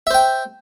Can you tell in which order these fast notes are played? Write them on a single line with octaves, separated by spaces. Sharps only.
E5 C5 G5